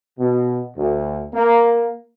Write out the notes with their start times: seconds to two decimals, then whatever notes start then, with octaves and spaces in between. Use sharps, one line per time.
0.19 B2
0.75 D2
1.33 A#3